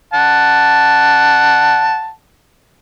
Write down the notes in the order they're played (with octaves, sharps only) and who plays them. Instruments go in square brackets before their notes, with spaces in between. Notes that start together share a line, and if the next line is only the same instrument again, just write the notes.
[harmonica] F#5 A5